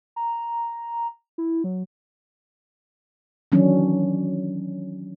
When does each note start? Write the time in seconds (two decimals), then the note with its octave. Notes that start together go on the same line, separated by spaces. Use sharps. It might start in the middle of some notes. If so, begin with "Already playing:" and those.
0.16 A#5
1.38 E4
1.64 F#3
3.52 D#3 E3 F#3 C#4 D4